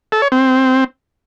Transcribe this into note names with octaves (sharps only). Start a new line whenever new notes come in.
A4
C#5
C4